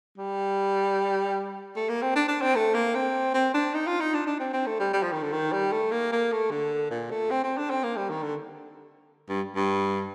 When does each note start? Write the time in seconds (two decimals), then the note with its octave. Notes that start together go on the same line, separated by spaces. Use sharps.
0.18 G3
1.76 A3
1.89 A#3
2.02 C4
2.16 D4
2.28 D4
2.42 C4
2.55 A3
2.74 A#3
2.95 C4
3.34 C4
3.54 D4
3.74 D#4
3.87 F4
4.00 D#4
4.14 D4
4.27 D4
4.39 C4
4.53 C4
4.66 A3
4.80 G3
4.93 G3
5.03 F3
5.13 D#3
5.22 D3
5.33 D#3
5.53 G3
5.72 A3
5.92 A#3
6.12 A#3
6.32 A3
6.51 D3
6.90 A#2
7.11 A3
7.30 C4
7.44 C4
7.57 D4
7.70 C4
7.84 A#3
7.97 G3
8.10 D#3
8.23 D3
9.29 G2
9.55 G2